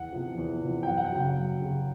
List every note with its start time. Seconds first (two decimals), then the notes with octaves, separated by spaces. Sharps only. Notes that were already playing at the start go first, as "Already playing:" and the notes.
Already playing: E2 F#5
0.13 C3 F3
0.37 E2
0.63 C3 F3
0.83 G5
0.87 F#2 F#5
0.97 F#5
1.04 G5
1.12 C#3 F#3
1.20 F#5
1.37 F#2
1.61 C#3 F#3